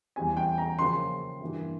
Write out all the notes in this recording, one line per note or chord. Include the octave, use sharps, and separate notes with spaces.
E2 E3 G3 C4 G#5
G5
A#5
C#3 F3 A#3 C#4 C6
G2 E3 A#3